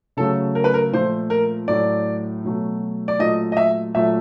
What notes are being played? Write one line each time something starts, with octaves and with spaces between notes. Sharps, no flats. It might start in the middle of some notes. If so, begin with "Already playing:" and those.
C#3 F#3 A3 A4
A#4
B4
A#4
A#2 F3 A3 C5
A#4
A2 F#3 A3 D5
B2 F#3 A3
D5
A#2 F#3 A3 D#5
D#5
E5
A#2 F#3 A3 E5